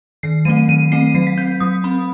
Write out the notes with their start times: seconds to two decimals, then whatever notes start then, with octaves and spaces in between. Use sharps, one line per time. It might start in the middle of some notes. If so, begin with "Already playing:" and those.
0.23 D#3 C7
0.45 F#3 A3 C4 D#7
0.68 D#3 D#7
0.92 A3 C4 C7
1.14 F#3 C7
1.27 B6
1.37 C4 G6
1.60 F#3 D#6
1.84 C4 B5